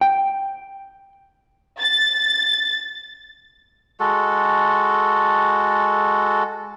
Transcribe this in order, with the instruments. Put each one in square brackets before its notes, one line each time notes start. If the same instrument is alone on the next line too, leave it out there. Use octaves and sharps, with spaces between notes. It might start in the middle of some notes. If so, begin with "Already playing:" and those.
[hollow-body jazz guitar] G5
[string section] A6
[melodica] G#3 F#4 A4